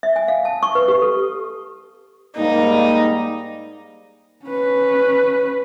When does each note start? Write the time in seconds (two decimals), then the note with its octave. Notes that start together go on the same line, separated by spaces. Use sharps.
0.03 E5
0.16 G#5
0.28 F5
0.45 A5
0.63 C#6
0.75 B4
0.88 G4
1.02 A4
2.36 G#2 G3 A#3 D#4
4.46 C#4 B4